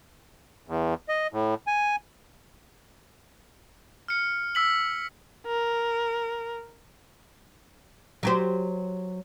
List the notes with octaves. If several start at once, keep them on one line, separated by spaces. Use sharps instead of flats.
E2
D#5
A2
G#5
F6 C#7
E6 B6 F#7
A#4
F#3 G4 C5